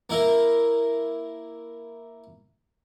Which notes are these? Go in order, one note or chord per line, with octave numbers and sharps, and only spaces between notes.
A#3 E4 A#4